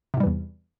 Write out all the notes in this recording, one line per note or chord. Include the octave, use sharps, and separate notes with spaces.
E2 G#2 C3 E3 G3